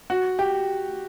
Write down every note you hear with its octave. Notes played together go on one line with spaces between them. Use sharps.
F#4
G4